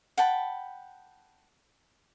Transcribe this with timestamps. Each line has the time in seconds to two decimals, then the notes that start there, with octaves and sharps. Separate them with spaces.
0.17 F#5 G5 A5 B5